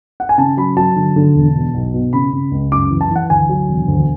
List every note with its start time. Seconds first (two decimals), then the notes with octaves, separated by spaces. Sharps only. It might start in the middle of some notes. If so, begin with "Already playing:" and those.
0.20 F#5
0.29 G#5
0.38 C#3 A5
0.57 F#3 B5
0.77 F#3 A5
0.96 D3
1.16 D3
1.35 E1
1.55 B2
1.74 B1
1.94 B2
2.13 C#3 B5
2.33 C#3
2.52 C#2
2.72 F#2 D6
2.91 E3
3.01 A5
3.11 E3 F#5
3.30 D2 G#5
3.49 F#3
3.69 E1
3.88 D2